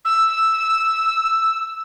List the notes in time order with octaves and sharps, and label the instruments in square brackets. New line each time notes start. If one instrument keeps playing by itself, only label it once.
[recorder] E6